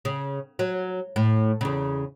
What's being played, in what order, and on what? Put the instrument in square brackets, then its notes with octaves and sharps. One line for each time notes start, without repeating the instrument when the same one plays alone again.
[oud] C#3
F#3
A2
E2 C#3